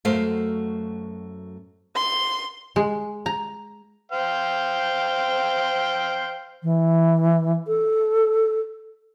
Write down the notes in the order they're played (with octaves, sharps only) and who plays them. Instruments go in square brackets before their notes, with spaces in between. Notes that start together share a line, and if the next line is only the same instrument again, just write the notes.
[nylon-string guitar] F#2 A3 F#4 A#4 C5 F5
[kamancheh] C6
[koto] G#3
A#5
[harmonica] C5 F5 G5
[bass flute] E3
A4